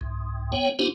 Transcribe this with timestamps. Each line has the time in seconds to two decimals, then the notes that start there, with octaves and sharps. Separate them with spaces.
0.01 C2 G#2
0.52 B3 C#5 G5
0.79 B3 C#4 D#4 F4 G4 C5